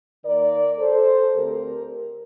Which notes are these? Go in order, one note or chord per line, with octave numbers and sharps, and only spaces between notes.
D#2 D#3 A#3 A#4 D5
A4 C5
D2 D3 A3 C4 G4 A#4